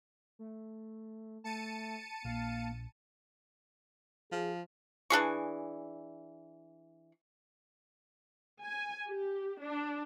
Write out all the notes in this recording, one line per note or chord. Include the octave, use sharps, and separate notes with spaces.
A3
A3 A5 C#7 D#7
A#1 A#3 F5
F3 G#4
E3 D4 G#4 C#6
G#5
G4
D4